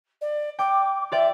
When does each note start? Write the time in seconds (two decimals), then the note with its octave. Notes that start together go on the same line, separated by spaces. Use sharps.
0.21 D5
0.59 G5 D6
1.12 F4 D5 E5 G5